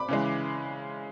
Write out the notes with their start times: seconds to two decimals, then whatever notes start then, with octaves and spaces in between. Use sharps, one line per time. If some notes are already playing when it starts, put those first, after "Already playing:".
Already playing: B5 D6
0.08 C#3 E3 G#3